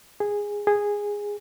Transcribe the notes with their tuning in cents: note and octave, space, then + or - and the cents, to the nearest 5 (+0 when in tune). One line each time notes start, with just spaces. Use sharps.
G#4 -10
G#4 -10